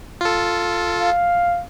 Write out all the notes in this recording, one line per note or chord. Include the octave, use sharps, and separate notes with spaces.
F4 A4
F5